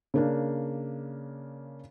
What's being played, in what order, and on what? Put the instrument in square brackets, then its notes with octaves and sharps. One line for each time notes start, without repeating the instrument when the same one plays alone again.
[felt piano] C#3 A#3 D4